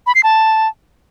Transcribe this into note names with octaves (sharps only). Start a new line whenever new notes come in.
B5
C7
A5